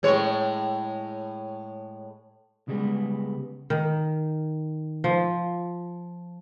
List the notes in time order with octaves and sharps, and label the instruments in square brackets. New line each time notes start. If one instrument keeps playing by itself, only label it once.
[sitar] A2 G#3 C#5
[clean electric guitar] C#3 G3 G#3 B3
[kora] D#3
F3